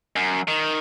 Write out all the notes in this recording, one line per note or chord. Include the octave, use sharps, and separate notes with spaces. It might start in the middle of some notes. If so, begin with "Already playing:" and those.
F#2
D#3